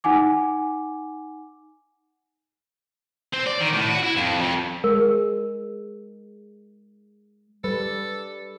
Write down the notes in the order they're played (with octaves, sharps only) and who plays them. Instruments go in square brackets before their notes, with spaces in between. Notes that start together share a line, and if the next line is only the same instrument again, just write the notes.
[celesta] D#4 F#5 G#5 D6
[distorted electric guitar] C4
D5
D#3
A2
F#4
E4
F2
F2
[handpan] G#3 [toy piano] A#4
[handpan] G3 [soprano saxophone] A4 [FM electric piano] B4